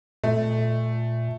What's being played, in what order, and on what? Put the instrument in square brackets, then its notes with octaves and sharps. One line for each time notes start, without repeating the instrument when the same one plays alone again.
[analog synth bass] A#2 [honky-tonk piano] A3